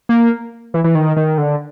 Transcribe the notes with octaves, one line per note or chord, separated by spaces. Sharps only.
A#3
E3
E3
D#3
D#3
D3